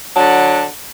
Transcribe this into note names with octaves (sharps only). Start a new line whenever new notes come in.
D3 F#3 D4